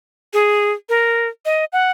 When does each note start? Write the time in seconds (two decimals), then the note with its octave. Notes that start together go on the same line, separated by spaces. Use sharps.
0.33 G#4
0.89 A#4
1.45 D#5
1.73 F#5